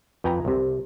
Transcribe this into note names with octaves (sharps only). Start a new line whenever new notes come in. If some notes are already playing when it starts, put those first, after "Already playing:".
F2 B4 G5 G#5 A#5
C2 C3